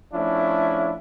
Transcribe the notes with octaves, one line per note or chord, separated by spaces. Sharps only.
F3 A3 C#4 D4 E4